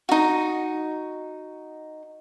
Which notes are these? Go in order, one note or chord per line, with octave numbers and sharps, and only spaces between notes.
D#4 F#4